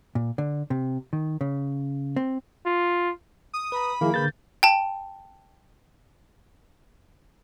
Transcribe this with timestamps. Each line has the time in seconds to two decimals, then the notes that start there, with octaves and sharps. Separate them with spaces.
0.15 A#2
0.38 D3
0.70 C3
1.13 D#3
1.41 C#3
2.16 C4
2.66 F4
3.54 D#6
3.72 B4 A#5 B5
4.01 D#3 F3 A#3 E4 G#4
4.14 D3 G#4 B4 F5 G6 A6
4.63 G5 A5